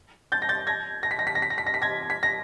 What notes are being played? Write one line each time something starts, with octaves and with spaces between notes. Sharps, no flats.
G6 A6
A#6
G6 A6
G#6 A#6
A#6
B6
A#6
B6
A#6
B6
A#6
B6
A#6
B6
G#6 A#6
B6
A#6